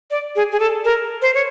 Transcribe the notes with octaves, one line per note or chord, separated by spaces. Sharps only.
D5
G#4
G#4
A4
A#4
C5
C#5